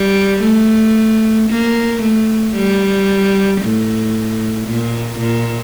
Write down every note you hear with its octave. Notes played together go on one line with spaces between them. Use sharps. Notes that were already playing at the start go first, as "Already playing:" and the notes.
Already playing: G3
A3
A#3
A3
G3
A2
A#2
A#2